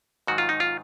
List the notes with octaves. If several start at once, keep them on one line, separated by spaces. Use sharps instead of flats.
G#2 D#3 F#3 F#4
F4
D#4
F4